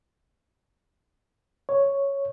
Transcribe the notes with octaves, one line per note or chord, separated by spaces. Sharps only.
C#5